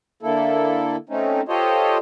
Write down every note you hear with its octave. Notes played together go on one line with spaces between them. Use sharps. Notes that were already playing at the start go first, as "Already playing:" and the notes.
D3 A#3 E4 A4
A3 C4 C#4 D#4
F4 G4 A4 C5 C#5 D#5